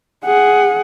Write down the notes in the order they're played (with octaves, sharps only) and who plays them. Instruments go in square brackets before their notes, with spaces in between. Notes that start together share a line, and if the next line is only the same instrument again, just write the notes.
[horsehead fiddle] G#4 F#5